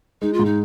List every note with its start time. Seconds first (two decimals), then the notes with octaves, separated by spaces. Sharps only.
0.22 G#3 D#4
0.33 F4
0.39 G#2
0.45 D#4